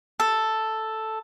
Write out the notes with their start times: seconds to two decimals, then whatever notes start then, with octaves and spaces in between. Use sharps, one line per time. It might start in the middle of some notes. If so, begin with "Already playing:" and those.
0.20 A4